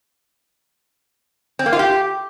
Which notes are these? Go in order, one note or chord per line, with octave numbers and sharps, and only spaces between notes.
C4
A#3
F4
G4